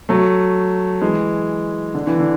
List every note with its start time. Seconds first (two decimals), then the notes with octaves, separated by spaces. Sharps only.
0.09 F#3 A3
1.01 E3 G#3
1.94 D3
2.07 E3
2.20 D3